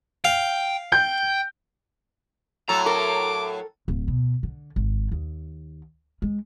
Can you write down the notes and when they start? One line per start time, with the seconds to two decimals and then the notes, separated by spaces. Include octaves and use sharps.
0.25 F5 G5
0.92 G5 G6
2.69 A2 F#3 A4 A#5
2.86 A4 A#4 D6
3.88 D1
4.08 B2
4.43 D3
4.76 G#1
5.12 D#2
6.22 G#3